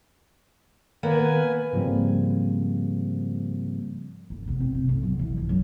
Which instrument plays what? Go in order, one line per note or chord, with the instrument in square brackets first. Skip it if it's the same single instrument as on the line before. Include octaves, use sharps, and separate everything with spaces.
[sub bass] D#3 [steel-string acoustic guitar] A#3 B3 [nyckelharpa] B4 G#5
[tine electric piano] G#2 C#3 F3 G3 A#3 C4
[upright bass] G1
B2
C4
C3
B1
F#3
E3
A#1
F#2